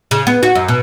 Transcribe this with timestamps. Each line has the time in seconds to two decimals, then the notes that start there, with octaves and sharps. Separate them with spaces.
0.11 C#3
0.27 B3
0.43 F#4
0.55 F#2
0.68 B2